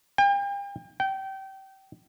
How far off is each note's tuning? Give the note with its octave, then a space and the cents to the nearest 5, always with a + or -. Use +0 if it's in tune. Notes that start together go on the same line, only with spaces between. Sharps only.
G5 +40
G5 -25